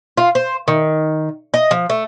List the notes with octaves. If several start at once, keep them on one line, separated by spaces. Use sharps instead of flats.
F4
C5
D#3
D#5
F3
A3